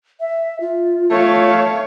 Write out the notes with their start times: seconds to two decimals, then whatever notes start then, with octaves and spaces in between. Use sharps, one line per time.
0.20 E5
0.61 F4
1.11 A3 C#5 F5